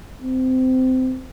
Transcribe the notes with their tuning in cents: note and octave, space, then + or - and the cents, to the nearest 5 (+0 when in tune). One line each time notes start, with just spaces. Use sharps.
C4 -20